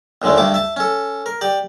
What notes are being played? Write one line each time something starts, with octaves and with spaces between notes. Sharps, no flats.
D#2 A#2 D3 G#3 A3
D2 G2 A3 A5 D6
E5 A5
C#4 A4
A#4
G4 D5